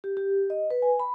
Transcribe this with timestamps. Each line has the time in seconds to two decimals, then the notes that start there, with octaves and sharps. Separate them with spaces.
0.04 G4
0.17 G4
0.50 D#5
0.71 B4
0.82 G#5
1.00 B5